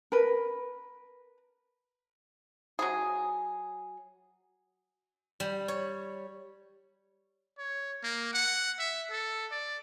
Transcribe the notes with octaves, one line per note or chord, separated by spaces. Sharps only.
A#4 B4
F#3 G#4
G3
C#5
C#5
A#3
F#5
E5
A4
D5